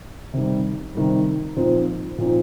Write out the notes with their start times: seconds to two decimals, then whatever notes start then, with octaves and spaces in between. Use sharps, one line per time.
0.34 C3 D#3 G3
0.95 C3 D#3 G3
1.56 A#2 F3 C4 D#4
2.18 A#2 F3 C4 D#4